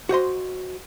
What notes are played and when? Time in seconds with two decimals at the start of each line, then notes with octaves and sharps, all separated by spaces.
0.09 F#4 C5 D#5 C6